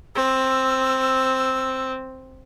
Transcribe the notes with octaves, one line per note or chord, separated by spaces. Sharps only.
C4 E6